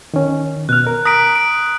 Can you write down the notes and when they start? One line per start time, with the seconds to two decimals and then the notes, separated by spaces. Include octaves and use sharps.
0.14 D#3 C#4
0.69 B2 F6 F#6
0.87 A#4
1.05 A#5 D#6 B6 D7
1.36 D7